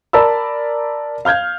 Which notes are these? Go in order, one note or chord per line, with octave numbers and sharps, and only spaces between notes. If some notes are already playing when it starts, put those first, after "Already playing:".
A#4 D5 A5 B5 E6
F5 F6 G6 G#6